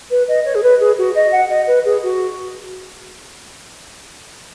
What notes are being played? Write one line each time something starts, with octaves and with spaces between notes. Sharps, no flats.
B4
D#5
C#5
G#4
B4
G#4
F#4
D#5
F#5
D#5
B4
G#4
F#4